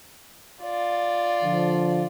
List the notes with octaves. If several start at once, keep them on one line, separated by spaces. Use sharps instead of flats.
F4 D5
D3 F3